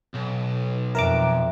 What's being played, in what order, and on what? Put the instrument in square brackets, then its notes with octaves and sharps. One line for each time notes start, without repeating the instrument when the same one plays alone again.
[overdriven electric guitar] B1
[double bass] F2 [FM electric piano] A#4 A#5 D6 [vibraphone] E5